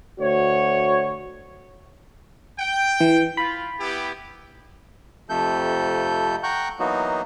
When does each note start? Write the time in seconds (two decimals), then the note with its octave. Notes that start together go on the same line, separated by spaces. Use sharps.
0.20 D2 F#4 C#5
2.59 G5
3.00 E3
3.37 F4 B5
3.80 B3 E4 G4
5.29 F2 C3 F3 A3 A4 G6
6.43 F#5 G5 A#5 C#6 F#6 G6
6.79 E3 F#3 A#3 B3 D#4 F#4